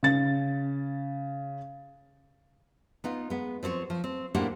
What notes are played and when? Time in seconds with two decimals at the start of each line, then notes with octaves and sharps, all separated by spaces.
0.03 C#3 A6
3.04 B3 D#4 F4
3.30 G#3 B3
3.63 F3 C4 C5 C#5
3.90 F3
4.04 C4
4.35 A2 A#3 D4 G4 C5 F#5